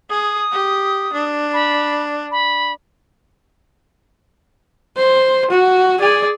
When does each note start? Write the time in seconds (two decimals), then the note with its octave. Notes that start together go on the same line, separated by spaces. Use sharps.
0.10 G#4 D#6
0.52 G4
1.13 D4
1.53 B5
2.31 B5
4.97 C5
5.51 F#4
6.00 G#4 D5